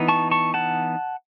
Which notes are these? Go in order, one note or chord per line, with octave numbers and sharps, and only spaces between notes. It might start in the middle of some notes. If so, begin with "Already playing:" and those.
Already playing: E3 B3 D#4
A5 C#6
A5 C#6
F#5 A5